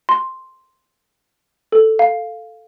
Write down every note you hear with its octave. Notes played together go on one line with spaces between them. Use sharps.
C6
A4
F5